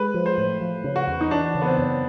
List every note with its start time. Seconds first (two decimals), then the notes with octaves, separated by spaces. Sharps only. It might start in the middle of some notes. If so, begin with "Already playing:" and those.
Already playing: G#3 B4
0.14 F3
0.26 C5
0.38 A2
0.61 F3
0.84 C#3
0.96 F#4
1.07 E2
1.21 D#4
1.31 E3 D4
1.55 C#3
1.62 B3
1.66 C4
1.78 F#2